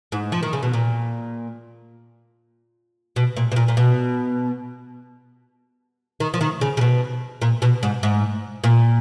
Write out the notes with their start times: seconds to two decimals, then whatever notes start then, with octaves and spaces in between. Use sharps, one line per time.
0.12 G#2
0.32 F3
0.43 D#3
0.53 C#3
0.63 B2
0.73 A#2
3.16 B2
3.37 A#2
3.52 B2
3.56 A#2
3.68 A#2
3.77 B2
6.20 D#3
6.34 F3
6.41 D#3
6.61 C#3
6.77 C#3
6.81 B2
7.42 A#2
7.62 B2
7.83 G#2
8.03 G#2
8.64 A#2